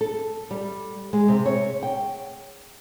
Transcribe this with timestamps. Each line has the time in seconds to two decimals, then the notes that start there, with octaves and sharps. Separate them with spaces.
0.01 A4
0.51 G3
1.13 G#3
1.28 C3
1.45 C#5
1.83 G5